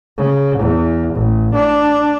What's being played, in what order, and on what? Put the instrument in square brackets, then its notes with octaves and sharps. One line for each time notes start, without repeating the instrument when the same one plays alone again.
[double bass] C#3
E2
A1
D4